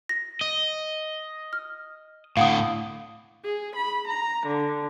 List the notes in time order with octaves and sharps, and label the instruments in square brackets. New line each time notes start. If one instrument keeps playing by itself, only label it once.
[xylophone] A#6
[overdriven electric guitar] D#5
[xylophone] F6
[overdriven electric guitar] A2 D3 [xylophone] F5 F#5 D#6
[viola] G#4
B5
A#5
D3